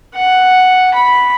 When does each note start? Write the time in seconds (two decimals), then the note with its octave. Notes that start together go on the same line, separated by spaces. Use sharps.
0.15 F#5
0.94 B5